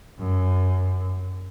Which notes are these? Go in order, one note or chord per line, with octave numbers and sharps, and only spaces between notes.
F#2